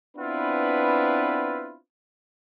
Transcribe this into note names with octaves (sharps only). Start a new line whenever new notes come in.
B3 C4 D4 E4 F4 B4